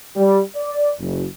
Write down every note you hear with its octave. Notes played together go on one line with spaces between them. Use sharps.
G3
D5
F#1